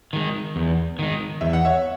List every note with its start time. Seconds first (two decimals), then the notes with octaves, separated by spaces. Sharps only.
0.13 D#3 G#3
0.56 E2
0.99 D#3 G#3
1.41 E2 E5
1.53 F#5
1.65 C#5 E5